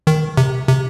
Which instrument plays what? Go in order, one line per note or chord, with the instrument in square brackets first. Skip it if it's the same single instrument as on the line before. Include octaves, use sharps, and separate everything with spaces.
[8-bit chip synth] D#3
C3
C3